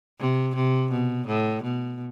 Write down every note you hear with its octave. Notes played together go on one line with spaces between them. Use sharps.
C3
C3
B2
A2
B2